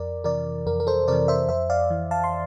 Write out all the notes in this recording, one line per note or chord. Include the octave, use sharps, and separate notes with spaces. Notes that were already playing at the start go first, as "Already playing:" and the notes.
Already playing: F2 A#4 D5
C3 E3 A#4 D5
F2 A#4
A#4
A4 C5
C3 E3 A#4 D5
C5 E5
F2 C5 E5
D5 F5
E3
F5 A5
C6